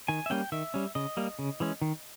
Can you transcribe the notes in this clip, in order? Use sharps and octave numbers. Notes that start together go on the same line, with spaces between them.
D#3 G#5
E5
G3 A#3 C#4 G5
D#3 E5
G3 C#4
C#3 D#5
G3 A#3
C#3
E3 G#3 C#4
D#3